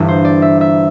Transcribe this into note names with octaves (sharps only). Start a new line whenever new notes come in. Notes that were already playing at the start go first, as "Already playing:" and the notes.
Already playing: G1 G2 E3
C5
D5
E5
E5